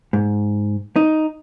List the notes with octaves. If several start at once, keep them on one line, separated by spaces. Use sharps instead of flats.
G#2
D#4